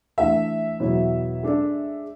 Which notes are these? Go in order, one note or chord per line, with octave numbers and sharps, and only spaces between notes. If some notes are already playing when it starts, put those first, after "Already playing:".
E3 A3 D4 A4 E5
E2 B2 F#3 B3 E4
G#3 D4 A4 D5